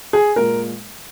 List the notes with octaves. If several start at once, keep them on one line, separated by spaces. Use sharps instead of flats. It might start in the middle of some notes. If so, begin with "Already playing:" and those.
G#4
A#2 G#3 A#4